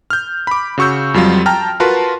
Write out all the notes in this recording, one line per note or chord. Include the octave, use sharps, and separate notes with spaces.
F6 G6
B5 D6
C#3 F#4 C#6 E6 G6
F2 F#3 G3 F4
G5 A5 A#5 F6
F4 F#4 A#4 B4 A5 C6